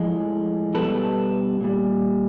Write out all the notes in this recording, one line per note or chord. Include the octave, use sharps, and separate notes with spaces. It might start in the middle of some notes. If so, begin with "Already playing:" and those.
Already playing: A2 F3 G#3
B2 G3 A4 B4
A#2 G3